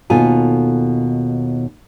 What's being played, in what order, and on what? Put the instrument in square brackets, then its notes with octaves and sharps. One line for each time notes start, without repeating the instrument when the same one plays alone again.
[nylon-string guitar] D#2 B2 F4 A4 G#5